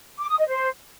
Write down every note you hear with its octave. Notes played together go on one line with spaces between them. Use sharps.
D6
D#6
D#5
C5